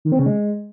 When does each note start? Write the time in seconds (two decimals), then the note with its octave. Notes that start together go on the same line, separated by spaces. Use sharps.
0.05 D#3
0.12 C4
0.19 C#3
0.26 G#3